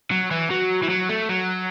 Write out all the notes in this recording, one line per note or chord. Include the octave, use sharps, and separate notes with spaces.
F#3
E3
F#3
E3
F#3
A3
F#3